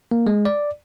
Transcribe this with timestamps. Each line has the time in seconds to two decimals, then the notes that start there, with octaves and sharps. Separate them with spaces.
0.11 A#3
0.27 G#3
0.45 D5